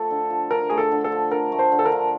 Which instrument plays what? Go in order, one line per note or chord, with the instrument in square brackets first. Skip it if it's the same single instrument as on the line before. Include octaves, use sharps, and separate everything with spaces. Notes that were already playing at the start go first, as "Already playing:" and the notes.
Already playing: [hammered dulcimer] F3 A3 [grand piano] A4
[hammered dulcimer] D3
F3
[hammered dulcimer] D3 [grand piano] A#4
[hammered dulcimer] A3 [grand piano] G#4
[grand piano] A4
[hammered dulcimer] D3
[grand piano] A4
[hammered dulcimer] F3
[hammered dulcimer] D3 [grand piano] A#4
[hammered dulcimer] A3
[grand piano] C5
[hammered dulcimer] D3
[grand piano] A4
A#4
[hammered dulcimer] F3